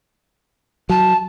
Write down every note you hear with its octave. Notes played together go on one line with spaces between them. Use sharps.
F#3 A5